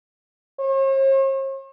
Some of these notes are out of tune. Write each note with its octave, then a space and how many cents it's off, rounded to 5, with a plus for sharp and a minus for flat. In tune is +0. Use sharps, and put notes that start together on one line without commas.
C#5 -45